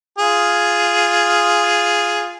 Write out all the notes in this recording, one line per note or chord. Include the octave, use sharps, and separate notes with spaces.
F4 G#4